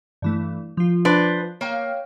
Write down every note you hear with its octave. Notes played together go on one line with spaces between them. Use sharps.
G2 E3 A3
F3 F4
D4 B4 C5
A#3 C#5 F5 G5